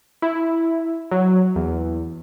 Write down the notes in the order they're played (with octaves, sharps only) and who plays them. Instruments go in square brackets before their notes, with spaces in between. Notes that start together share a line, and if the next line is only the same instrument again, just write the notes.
[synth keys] E4
F#3
E2